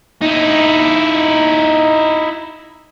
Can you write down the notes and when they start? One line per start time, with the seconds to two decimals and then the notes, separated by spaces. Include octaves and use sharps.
0.22 D#4 E4